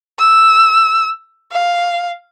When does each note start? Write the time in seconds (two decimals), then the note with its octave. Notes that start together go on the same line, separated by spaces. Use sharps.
0.19 E6
1.52 F5